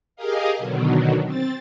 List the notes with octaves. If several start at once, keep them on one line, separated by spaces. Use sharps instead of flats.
G4 G#4 A#4 D#5 F5
B2 D3 D#3 F#3
C4 A6